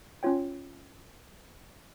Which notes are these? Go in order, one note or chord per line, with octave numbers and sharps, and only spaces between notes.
C#4 F4 C#5 G5